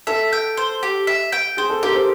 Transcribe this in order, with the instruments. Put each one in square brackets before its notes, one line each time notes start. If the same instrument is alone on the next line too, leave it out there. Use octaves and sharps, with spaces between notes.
[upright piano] A4 [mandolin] E5
[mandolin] G5
C5
G4
E5
G5
[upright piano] G#4 [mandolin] C5
[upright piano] A4
[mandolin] G4 [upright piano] A#4
[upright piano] C5